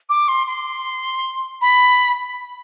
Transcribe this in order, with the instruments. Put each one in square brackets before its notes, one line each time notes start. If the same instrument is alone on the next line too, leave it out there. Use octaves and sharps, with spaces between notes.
[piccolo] D6
C6
C6
B5